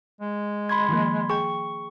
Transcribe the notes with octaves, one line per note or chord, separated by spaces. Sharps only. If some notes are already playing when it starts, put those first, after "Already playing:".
G#3
B5 C6 G#6
D#3 F3 A#3
G#4 G5 C#6